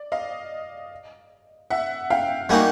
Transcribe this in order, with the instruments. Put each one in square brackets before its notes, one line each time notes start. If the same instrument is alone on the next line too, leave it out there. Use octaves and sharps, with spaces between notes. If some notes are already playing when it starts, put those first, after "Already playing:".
Already playing: [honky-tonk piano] D5
D#5 F5
E5 F#5
F5 G5
[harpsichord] G3 A#3 D#4 F#4 [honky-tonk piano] F#5 G#5